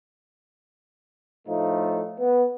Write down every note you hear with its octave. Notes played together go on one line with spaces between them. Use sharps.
A2 F3 A3 D#4
B3